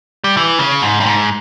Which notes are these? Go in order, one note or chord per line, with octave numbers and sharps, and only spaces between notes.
G3
E3
C#3
G#2
G2
G#2